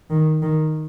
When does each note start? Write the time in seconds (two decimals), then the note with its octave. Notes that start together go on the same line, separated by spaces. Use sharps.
0.10 D#3
0.42 D#3